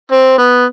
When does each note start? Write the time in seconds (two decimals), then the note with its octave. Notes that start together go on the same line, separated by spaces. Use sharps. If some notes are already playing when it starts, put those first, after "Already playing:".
0.12 C4
0.38 B3